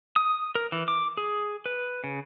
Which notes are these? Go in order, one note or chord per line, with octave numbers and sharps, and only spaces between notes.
D#6
A#4
E3
D6
G#4
B4
C#3